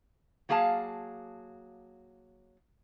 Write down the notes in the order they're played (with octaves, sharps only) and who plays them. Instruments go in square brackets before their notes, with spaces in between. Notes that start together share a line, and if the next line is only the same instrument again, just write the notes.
[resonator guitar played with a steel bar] F#3 A#3 G#4 F5 A5